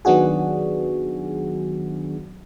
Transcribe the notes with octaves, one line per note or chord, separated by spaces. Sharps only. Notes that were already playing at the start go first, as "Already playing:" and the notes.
D#3 F#3 B3 D4 F#4 G#4